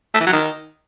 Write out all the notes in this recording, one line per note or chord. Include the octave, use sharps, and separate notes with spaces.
A3
E3
F#3
D#3